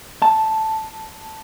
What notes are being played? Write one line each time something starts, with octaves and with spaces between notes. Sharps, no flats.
A5